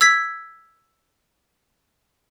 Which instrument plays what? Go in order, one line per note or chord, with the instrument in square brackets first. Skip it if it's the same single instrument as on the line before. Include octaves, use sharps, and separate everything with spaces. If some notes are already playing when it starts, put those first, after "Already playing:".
[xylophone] E6 G#6 B6